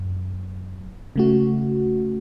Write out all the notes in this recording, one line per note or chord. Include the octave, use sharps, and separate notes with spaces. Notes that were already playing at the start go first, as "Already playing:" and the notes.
Already playing: F#2
C#3 A3 F#4